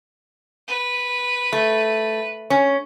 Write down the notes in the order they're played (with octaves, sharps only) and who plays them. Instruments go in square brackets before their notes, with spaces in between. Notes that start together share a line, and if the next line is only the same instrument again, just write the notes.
[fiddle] B4
[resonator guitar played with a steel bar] A3
C#4